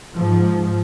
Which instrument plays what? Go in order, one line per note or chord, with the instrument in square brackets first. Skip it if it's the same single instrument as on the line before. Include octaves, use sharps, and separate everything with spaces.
[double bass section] G#2 F3